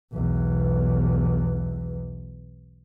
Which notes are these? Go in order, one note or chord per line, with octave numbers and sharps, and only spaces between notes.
B1 E2